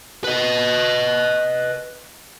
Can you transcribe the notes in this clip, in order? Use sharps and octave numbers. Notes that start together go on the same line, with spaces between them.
B4 D#5